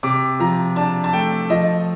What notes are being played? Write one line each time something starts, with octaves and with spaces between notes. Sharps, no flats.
C3 D6
F3 A#5
D4 A5
A5
A3 G5
F3 D#5